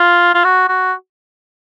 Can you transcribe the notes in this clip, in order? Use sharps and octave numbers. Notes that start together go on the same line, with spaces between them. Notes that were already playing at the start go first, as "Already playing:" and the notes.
Already playing: F4
F4
F#4
F#4